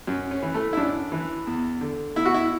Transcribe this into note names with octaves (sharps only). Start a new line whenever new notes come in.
F#2
C#4
E3
A3
E4
F#2 D4
E3
E2
D3
E2 E4
F#4
E4